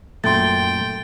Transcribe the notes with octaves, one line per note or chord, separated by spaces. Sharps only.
F#2 A#2 A3 G5 C6 G6 A6